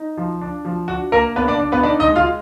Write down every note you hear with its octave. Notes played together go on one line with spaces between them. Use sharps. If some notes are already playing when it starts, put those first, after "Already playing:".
Already playing: D#4
F3
D4
F3
D4 F#4
A#3 A#4
B3 D4 B4
D4 D5
D4
B3 B4
D4 D#4 D5
D#4 D#5
G#3
F4 F5